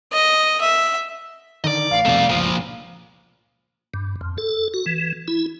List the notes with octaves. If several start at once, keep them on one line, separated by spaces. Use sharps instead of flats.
D#5
E5
D3 D#3 D5 D#5
A1 F5
C2 F2 B2 A3 D5
G1 C#2 A#2 F3
G2
F2
A4
F#4
E3
E4